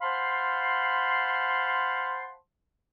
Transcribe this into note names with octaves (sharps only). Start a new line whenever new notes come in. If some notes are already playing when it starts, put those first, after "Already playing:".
C5 F5 F#5 A5 B5 C6